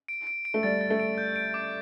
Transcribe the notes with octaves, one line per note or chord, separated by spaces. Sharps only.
D7
D7
D7
A3
G3 A6
A6
A3
D7
G6
D7
D6